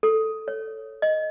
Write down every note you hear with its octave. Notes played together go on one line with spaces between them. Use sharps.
A4
C#5
D#5